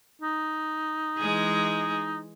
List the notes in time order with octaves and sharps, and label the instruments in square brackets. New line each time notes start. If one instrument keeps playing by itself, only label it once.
[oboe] D#4
[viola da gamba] E3 G#3 G#4